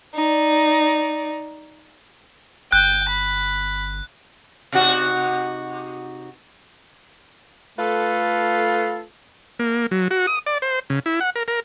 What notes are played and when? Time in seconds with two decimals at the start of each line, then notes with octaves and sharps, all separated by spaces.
0.15 D#4 D5
2.72 G1 G5 F#6
3.09 B5
4.72 C3 D#4 F#4
7.79 A3 F4 A4 B4
9.59 A#3
9.91 F#3
10.11 F#4
10.27 D#6
10.46 D5
10.62 C5
10.90 C#3
11.06 E4
11.21 F#5
11.36 A#4
11.48 A#4